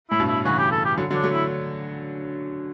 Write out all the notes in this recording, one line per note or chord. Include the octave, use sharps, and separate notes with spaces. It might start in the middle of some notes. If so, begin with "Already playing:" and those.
A2 E4
G2 B2
E4
C#3 E3 F#4
G4
A4
G4
D3 F#3
D3 F#3
D4
F#3 A3
E4